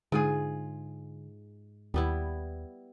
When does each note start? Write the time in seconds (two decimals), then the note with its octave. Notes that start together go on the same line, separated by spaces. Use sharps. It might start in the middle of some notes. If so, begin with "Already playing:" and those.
0.12 G#2 D3 F4 G#4
1.94 D#2 G3 B3 E4